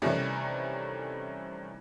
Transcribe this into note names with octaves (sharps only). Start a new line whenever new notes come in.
C3 D#3 E3 G3 A3 C#4